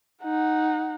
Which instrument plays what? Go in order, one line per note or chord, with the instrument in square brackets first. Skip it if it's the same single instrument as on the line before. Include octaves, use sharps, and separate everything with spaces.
[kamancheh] D#4 F#5